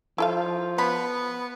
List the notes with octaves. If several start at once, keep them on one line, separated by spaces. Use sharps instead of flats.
F3 E4 A4 F5
B3 B5